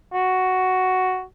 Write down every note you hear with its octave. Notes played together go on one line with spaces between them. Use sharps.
F#4